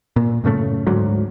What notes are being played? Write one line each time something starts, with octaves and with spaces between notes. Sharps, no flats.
A#2
F#2 A2 C#3 A3
D2 G#2 F#3